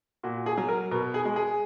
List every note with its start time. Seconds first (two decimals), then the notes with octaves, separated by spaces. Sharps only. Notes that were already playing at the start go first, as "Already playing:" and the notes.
0.23 A#2 F#4
0.46 G#4
0.58 F#3
0.68 A#4
0.91 B2 A#4
1.14 G#4
1.25 G#3
1.36 G#4